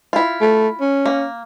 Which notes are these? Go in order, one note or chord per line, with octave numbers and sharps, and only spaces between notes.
E4 F4
A3
C#4
A#3